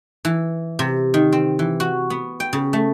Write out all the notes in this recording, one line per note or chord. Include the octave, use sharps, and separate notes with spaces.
E3
C3
D#3
C4
E3
F#4
B3
G5
C#3
A3